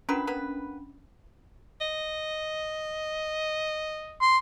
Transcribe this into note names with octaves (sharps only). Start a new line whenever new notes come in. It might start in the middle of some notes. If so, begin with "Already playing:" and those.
C#4 D4 F4 A#4 B4 B5
A#3 B3 B4
D#5
C6